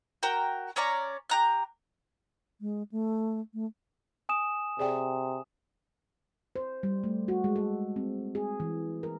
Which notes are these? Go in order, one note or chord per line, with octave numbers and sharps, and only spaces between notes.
F#4 A#4 G5
C#4 C#5 D5 A#5
G4 A#5 F#6
G#3
A3
A3
G#5 D#6 E7
C3 G#4 D5 G5
C5
G3
A3
F#4
G#3
A4
C4
G#4
E3
A#4